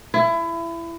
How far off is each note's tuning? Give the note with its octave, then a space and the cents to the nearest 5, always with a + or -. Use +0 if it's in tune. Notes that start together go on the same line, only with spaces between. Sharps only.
E4 +25